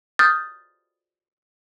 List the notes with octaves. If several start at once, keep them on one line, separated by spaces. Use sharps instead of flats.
D#6 F6 G6 A6